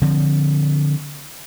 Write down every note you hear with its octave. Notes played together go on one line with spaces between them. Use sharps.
D3 F3 C4